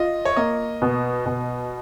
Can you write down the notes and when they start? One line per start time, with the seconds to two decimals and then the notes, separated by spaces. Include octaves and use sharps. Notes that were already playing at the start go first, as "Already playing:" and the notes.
Already playing: F4 D#5
0.25 C#5
0.36 A#3 D#5
0.82 B2
1.26 B2